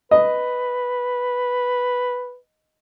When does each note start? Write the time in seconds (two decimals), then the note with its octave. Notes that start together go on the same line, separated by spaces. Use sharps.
0.11 B4 D#5